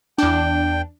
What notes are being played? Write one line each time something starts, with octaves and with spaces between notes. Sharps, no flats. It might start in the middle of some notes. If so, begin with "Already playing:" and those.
E2 D4 G5